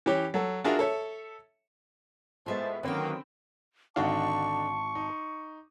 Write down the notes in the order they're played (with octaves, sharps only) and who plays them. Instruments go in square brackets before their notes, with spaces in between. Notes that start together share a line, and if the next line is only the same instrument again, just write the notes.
[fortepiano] E3 C#4 G4 C#5
F#3 A4
D4 F4 F#4 G#4 A#4 E5
A4 C#5 E5
[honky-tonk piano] A2 G#3 B3 [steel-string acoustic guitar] F4 E5 F5 [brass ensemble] C5 A5
[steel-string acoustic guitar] D3 C#4 G5 [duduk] D#3 [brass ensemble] F#3 A#3 [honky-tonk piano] C4 B4
[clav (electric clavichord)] G#1 F#4 F5 [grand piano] D3 D4 D#4 [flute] A5 [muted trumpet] C#6
[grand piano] D#4